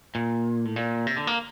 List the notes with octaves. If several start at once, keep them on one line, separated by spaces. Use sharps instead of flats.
A#2
A2
A#2
C3
D3
A#3